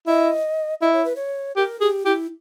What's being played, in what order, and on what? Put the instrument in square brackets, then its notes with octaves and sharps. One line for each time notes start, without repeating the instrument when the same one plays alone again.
[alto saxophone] E4 [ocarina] D#5
[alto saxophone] E4 [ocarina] D#5
[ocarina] C#5
B4
C#5
[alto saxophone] G4 [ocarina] A#4
[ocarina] G4 [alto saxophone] G#4
[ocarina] E4 [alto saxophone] G4